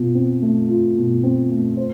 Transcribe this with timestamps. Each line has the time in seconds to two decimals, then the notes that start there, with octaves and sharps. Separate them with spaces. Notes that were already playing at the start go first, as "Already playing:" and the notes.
Already playing: B2 F4
0.15 C4
0.42 A3
0.69 F4
0.96 B2
1.23 C4
1.51 A3
1.77 C5